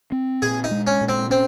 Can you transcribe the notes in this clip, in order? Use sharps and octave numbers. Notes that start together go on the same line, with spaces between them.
C4
A#2 G#4
D#4
G#3
C#4
A#2
C4
C4 C#4